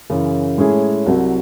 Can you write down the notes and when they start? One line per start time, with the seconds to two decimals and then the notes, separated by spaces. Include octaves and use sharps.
0.10 F#2 C#3 E3
0.58 A2 G#3 C#4 E4 G#4
1.06 C2 C3 F#3